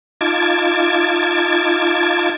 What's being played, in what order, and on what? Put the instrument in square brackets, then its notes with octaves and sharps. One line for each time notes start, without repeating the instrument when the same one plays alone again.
[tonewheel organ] D#4 F4 A5 D6 G#6